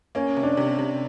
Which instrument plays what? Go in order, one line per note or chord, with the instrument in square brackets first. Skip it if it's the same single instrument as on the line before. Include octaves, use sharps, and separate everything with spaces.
[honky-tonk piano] A#3 [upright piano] C#4
[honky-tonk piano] C3
[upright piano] D4
[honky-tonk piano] C3
C3